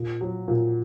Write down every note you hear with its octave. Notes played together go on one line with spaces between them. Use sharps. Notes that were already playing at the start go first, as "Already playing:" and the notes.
Already playing: A#2
F#3
A#2